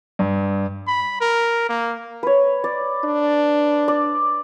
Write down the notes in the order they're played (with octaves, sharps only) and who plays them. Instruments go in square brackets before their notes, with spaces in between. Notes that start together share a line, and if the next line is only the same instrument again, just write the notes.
[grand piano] G2
[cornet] B5
A#4
A#3
[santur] B4 C#5
D5
[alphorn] D4
[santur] D5